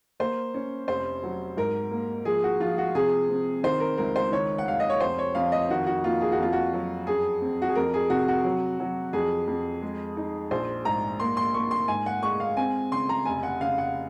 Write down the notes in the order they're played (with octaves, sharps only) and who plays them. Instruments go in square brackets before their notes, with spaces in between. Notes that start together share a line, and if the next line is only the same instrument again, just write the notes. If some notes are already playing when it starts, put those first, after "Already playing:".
[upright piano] A#3 C5
C#4
F1 C5
F#3
G#2 A#4
A#3
F3 G#4
F#4
F3 F4
F#4
C3 G#4
C4
D#3 C5
A#4
C#2 A#4
C5
D#3 C#5
F#5
F1 F5
D#5
C#5
F2 C5
C#5
F2 F5
D#5
D#3 F#4
F#4
A#3 F4
G#4
F#4
F2 F4
F#4
F#3
F#2 G#4
C4
F#4
G#4
F2 A#4
G#4
C3 F#4
F#4
F#3
F#3
F2 G#4
F2
G#3
D#4
A#1 C5
G#2 A#5
A#3 C6
C6
A#3 C#6
C6
G#2 G#5
F#5
G#3 C#6
F5
C4 G#5
C#3 C6
A#5
F1 G#5
F#5
C#3 F5
F#5